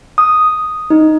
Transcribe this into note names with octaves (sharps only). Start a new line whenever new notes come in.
D#6
D#4